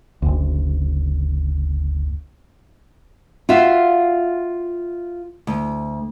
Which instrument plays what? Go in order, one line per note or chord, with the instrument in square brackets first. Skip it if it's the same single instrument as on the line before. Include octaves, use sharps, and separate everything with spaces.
[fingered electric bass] F#1 D2
[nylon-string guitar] F4 F#4 E5 F5
D2